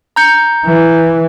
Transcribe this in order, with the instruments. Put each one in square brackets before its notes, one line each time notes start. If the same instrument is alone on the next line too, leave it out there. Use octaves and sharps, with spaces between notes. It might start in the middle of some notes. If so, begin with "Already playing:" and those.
[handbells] A#5 G6 C#7
[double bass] E3